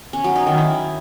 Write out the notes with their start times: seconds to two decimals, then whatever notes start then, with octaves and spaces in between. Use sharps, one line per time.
0.13 C#4
0.24 F#3
0.35 D#4
0.47 D#3
0.58 E4